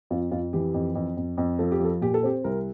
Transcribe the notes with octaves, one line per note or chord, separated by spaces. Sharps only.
F2 F4
F2 F4
E3 G4
F2
F2
F2
F2
F3 A4
G4
F3 A4
A#2 G4
A4
C4 G4
C2 A#4